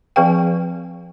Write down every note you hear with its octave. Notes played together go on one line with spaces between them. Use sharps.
F3 C4 G#4 B4 F5 G5